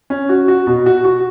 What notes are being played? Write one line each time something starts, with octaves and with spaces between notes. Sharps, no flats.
C#4
F#4
F#4
B2
F#4
F#4